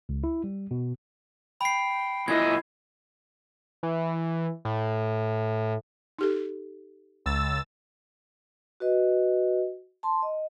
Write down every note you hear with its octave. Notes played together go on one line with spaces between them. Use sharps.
C#2
E4
G3
B2
G5 B5 C7
A#2 F#3 E4 D#5 G#6
E3
A2
D#4 G4 A4
C#2 E6 A6
F#4 B4 D#5
A5 C6
D#5